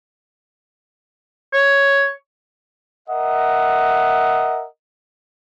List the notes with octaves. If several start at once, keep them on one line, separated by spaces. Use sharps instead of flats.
C#5
A#4 D#5 E5 F#5